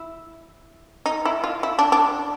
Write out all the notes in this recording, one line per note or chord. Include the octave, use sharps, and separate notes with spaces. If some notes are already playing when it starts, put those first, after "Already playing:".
Already playing: E4
D#4
E4
F4
E4
D4
D4